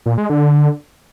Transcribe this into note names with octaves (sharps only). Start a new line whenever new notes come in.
A#2
G#3
D3